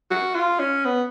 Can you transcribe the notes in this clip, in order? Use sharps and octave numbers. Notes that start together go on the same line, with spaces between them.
F#4
F4
C#4
B3